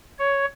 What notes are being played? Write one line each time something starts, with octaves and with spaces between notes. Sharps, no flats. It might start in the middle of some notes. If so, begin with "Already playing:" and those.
C#5